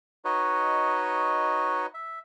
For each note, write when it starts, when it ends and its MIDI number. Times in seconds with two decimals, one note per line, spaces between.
0.25 1.86 63
0.25 1.86 66
0.25 1.86 71
0.25 1.86 73
0.25 1.86 75
1.94 2.19 76